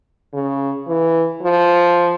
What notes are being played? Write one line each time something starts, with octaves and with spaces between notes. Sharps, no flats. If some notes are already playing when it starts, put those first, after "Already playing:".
C#3
E3
F3